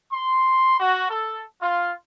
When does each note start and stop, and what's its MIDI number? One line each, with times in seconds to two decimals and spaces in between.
0.11 0.74 84
0.80 1.07 66
1.09 1.42 69
1.61 1.90 65